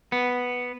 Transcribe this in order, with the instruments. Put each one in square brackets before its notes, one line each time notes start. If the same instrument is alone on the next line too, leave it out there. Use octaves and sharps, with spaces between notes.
[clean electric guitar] B3